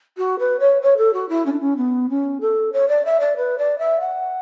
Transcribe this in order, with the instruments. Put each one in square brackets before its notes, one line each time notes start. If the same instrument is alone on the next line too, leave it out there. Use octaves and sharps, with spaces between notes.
[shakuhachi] F#4
B4
C#5
C#5
A4
F#4
E4
C#4
D4
C#4
B3
C#4
A4
C#5
D5
E5
D5
B4
D5
E5
F#5